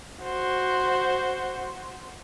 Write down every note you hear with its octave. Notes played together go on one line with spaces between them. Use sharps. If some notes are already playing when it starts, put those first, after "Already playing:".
F#4 C5